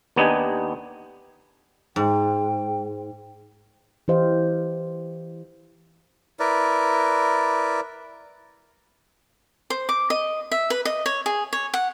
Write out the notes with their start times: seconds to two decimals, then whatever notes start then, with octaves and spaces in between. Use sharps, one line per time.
0.16 D#2 B3 D4 D#4 G4 G#5
1.96 G#2 G5
4.08 E3 E4 G4 C5 D#5 F5
6.40 E4 A#4 B4 D5
9.70 C5
9.89 D6
10.10 D#5
10.51 E5
10.70 B4
10.85 D#5
11.06 C#5
11.26 G#4
11.53 C#5
11.74 F#5